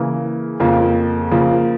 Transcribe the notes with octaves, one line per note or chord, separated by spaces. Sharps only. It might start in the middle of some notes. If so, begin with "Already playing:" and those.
Already playing: C#3 E3 A#3
F2 C#3 F3 A#3
C#3 F3 A#3